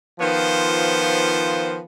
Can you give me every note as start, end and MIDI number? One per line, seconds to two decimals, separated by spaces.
0.20 1.80 51
0.20 1.80 53
0.20 1.80 59
0.20 1.80 65
0.20 1.80 72